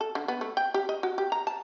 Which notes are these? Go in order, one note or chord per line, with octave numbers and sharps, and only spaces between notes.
A4
D3
B3
A3
G5
G4
D#5
F#4
G4
A#5
A5